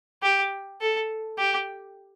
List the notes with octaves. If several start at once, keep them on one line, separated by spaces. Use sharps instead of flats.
G4
A4
G4